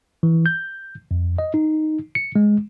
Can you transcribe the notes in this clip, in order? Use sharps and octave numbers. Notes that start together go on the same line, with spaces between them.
E3
G6
F2
D#5
D#4
C#7
G#3